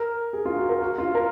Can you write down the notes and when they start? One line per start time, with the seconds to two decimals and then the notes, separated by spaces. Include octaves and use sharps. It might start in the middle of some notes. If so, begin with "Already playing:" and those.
Already playing: A#4
0.33 G#4
0.45 F4
0.57 F#4
0.69 A#4
0.82 F#4
0.98 F4
1.15 A#4